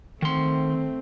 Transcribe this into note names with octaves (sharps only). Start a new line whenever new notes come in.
D#3 A3 C4 C6